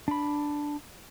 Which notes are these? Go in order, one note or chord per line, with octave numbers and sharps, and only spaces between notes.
D4 B5